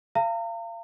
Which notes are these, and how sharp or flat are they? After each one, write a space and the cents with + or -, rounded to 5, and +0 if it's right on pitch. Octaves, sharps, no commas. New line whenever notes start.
F5 -35 A#5 -40